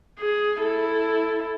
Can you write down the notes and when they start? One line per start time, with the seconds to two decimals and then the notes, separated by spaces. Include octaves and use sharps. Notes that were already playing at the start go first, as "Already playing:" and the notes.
0.19 G#4
0.61 E4 A4